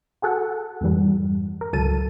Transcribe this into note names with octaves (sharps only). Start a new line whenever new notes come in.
F#4 G#4 A4 F#5
F2 G#2 E3 G3
A#4
C#2 G#2 F#3 A4 A5 D#7